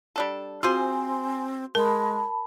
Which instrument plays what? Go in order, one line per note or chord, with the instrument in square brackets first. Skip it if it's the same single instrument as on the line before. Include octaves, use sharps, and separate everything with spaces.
[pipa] G3 D4 A4
[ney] C4 [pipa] F4 G#4 C5 [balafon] F#4 [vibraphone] G#5 C6
[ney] G#3 [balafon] A#4 [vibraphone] A5 B5